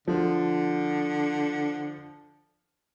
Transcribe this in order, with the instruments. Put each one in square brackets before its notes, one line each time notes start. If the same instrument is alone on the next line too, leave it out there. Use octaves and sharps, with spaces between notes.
[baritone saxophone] D3 [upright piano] F3